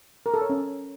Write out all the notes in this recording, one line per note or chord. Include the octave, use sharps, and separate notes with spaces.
A#4
A4
C#5
C#4